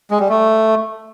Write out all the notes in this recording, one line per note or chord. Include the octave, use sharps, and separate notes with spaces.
G#3
G3
A3